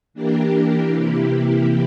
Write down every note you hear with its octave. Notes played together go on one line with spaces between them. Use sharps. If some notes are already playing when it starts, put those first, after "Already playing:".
E3 A#3 D4 G4 A#4
C3 E3 A#3 E4 G4